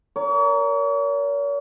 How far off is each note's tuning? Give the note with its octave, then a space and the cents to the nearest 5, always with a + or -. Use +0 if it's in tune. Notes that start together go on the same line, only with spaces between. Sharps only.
A#4 +0 C#5 +40